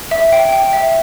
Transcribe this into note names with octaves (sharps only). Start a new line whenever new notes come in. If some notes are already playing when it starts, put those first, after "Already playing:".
E5
G5
G5
E5